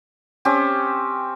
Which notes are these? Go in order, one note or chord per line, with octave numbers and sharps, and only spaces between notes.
C4 C#4 G4